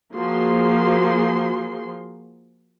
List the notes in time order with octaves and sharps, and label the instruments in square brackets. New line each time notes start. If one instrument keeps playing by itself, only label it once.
[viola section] F3 A#3 F#4 G#4 C6